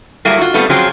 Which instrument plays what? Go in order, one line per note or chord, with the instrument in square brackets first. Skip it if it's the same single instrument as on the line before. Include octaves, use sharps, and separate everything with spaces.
[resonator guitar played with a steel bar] F#3 G3 A3 A#3 E4
F4 F#4
G3 A3 B3 C4 F4
C#3 F3 F#3 C4 F4 G#4